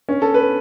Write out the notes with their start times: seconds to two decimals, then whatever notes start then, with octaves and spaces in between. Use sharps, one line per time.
0.09 C#4
0.22 A4
0.34 B4